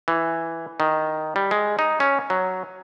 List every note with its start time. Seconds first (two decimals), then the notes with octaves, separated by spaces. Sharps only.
0.08 E3
0.80 D#3
1.36 G3
1.51 G#3
1.79 D#4
2.00 C#4
2.30 F#3